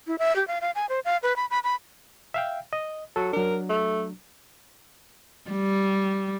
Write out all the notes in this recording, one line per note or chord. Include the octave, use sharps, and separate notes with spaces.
E4
E5
G4
F5
F5
G#5
C5
F5
B4
B5
B5
B5
E5 F5 G5
D#5
F#3 A4
F#3 D4 A#4
A3
G3